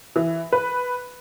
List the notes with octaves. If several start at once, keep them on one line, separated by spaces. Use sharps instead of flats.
E3
B4